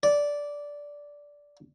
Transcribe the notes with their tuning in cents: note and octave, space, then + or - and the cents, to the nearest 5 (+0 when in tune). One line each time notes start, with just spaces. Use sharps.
D5 -10